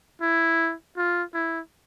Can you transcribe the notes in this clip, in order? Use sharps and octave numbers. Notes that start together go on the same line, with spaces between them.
E4
F4
E4